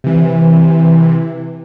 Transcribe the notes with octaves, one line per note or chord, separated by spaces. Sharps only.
C3 E3